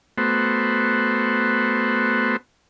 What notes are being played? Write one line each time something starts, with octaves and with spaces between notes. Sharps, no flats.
A3 B3 F#4 C5